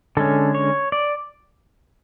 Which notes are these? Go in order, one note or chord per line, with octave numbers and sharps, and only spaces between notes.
D3 G#3 C#4 A4
C#5
D5